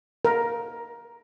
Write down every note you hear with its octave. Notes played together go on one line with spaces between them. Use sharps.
A#4